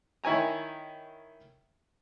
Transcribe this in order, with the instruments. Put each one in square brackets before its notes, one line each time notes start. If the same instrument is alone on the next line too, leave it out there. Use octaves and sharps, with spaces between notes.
[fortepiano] D#3 E4 C#5 G#5 A#5